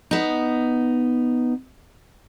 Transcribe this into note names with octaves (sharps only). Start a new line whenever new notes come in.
B3 D#4